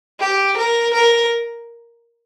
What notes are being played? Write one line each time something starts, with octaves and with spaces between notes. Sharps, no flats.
G4
A#4
A#4